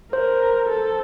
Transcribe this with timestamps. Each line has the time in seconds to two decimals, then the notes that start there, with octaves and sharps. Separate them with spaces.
0.13 A#4 C5
0.69 A4